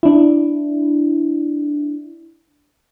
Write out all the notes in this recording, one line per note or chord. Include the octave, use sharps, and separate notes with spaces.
D4 E4